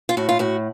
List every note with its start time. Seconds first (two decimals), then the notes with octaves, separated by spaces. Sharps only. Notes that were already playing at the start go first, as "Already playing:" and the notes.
0.09 F4
0.17 A2 F#4
0.29 F4
0.39 A2 F#4